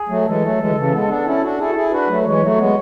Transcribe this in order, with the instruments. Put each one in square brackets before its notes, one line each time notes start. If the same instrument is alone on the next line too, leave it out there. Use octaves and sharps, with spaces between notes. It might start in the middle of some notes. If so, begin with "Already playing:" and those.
Already playing: [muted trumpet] G#4
[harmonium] F#3 A3
[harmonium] E3 G#3 [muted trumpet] A4
[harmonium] F#3 A3
E3 G#3
D3
C#3 E3
G#3 B3
B3 D4
C#4 E4
D4 F#4
[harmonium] E4 G#4 [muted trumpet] A4
[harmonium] F#4
E4 G#4
[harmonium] D4 F#4 [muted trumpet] B4
[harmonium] F#3 A3
[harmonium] E3 G#3 [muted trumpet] C#5
[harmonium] F#3 A3
G#3 B3